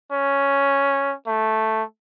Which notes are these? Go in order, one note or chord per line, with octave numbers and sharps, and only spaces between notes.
C#4
A3